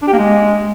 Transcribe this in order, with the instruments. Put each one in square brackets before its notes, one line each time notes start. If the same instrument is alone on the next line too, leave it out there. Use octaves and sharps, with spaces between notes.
[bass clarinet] D4
G4
A#3
G#3